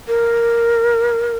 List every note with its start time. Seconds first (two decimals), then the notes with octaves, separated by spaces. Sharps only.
0.08 A#4